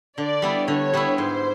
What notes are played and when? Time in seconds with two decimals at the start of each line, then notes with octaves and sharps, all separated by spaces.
0.18 D3 D5
0.42 G3 B3 E4
0.68 D3 C#5
0.94 G3 B3 E4
1.18 G#2 C5